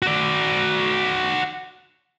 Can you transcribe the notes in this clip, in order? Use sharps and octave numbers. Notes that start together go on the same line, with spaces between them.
F#4 D5